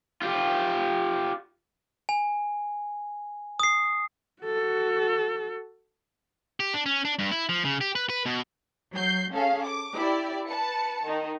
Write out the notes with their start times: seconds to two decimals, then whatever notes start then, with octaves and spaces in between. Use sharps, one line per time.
0.22 F4 G4
2.09 G#5
3.60 D#6 C7
4.42 F#4 A4
6.60 G4
6.74 D4
6.86 C#4
7.05 D4
7.19 G2
7.32 E4
7.49 F3
7.65 C#3
7.81 G4
7.95 B4
8.10 B4
8.26 B2
8.93 F#3 G6 C7
9.34 C#4 G#4 A4 F5
9.65 D6
9.96 E4 G4 D5
10.47 B4 A5 C#7
11.04 D#3 D#4